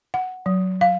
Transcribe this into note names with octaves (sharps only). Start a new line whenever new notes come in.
F#5
F#3
F5